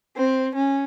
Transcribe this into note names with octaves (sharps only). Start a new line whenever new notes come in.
C4
C#4